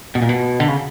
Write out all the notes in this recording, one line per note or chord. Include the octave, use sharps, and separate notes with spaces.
B2
A#2
B2
D3
C#3